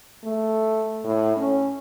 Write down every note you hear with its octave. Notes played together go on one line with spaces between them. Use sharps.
A3
A2
C#4